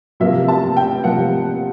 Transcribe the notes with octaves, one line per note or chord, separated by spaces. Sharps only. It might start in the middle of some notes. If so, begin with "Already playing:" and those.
C3 F3 A#3 E5
A5
G5
C3 F3 A#3 F#5